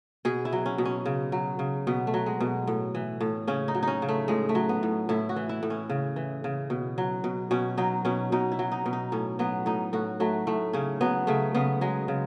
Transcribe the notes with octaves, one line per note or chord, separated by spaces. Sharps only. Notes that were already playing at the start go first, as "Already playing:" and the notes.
B2 G#4
E4
F#3
C#4
B2
C#4
C#3
F#3
C#3
B2 B3
A3
F#3
G#3
B2
A2
E3
A2
C#3 C#4
D#4
F#3
C#4 D#4
C#3
A3
A2 G#3
A3
F#3
B3
A2
A2 E4
F#4
E3
E4
A2
C#4
C#3
E3
C#3
B2
F#3
B2
B2 C#4
F#3 D#4
B2 C#4
B2 D#4
E4
F#3
D#4
B2
D#4
A2 C#4
F#3 B3
A2 D#4
A2 F#4
F#3 A3
A2 A3
C#3 C#4
F#3 B3
C#3 A3
C#3 B3
F#3 G#3
C#3